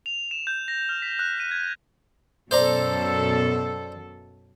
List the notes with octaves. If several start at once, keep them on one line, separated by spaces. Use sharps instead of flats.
F7
E7
G6
A#6
F6
B6
F#6
D#7
G#6
F#2 B2 A4 C5 D5 A#5